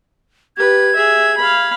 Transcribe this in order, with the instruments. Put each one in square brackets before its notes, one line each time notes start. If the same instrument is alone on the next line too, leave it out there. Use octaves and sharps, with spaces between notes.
[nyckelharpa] G4 B4 [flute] G#6
[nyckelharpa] G#4 E5
F5 B5